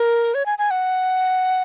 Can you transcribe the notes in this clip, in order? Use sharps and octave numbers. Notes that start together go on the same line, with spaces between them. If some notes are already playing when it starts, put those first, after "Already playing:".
Already playing: A#4
C#5
G#5
G#5
F#5